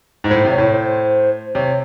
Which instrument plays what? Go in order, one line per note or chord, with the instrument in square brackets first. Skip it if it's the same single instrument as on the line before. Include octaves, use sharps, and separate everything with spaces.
[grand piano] G#2
[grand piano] A2 [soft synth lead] C5
[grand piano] C3
[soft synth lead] C#5
[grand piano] A2
[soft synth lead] C5
[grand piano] C3 [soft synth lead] C#5